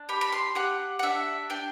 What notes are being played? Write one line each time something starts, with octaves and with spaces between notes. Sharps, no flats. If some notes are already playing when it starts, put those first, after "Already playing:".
Already playing: D4
G4 B5
B5
C6
G4 F#5
F#5
D4 E5
D4 G5